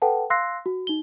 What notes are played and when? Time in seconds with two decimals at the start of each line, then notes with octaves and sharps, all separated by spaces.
0.02 A4 B4 F#5 G5 A5
0.30 F5 C6 E6 F#6 A#6 C7
0.66 F#4
0.87 D#4 G7